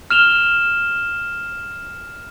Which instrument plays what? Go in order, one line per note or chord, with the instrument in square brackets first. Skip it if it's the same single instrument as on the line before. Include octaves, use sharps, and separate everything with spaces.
[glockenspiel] F6 E7 F7 G7